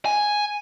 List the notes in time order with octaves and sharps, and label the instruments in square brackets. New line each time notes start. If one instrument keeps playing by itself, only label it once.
[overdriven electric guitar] G#5